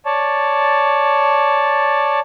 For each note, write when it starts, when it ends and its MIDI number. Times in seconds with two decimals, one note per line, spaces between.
0.06 2.20 73
0.06 2.20 74
0.06 2.20 81